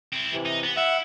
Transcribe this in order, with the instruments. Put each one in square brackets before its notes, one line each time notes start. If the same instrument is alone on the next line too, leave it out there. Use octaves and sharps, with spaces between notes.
[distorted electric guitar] C4 E4
[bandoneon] C3 E3
[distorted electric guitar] D#4
B3
[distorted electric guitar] E4 [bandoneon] E5 F#5